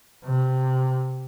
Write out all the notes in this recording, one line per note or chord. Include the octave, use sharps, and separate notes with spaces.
C3